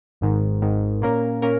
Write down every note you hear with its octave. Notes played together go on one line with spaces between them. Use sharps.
G#1 G#2 D#3
G#1 G#2 D#3
A#2 A#3 C#4 A#4
A#2 A#3 C#4 A#4